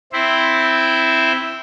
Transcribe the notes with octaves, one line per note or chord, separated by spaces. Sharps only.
C4 E4 C5 E5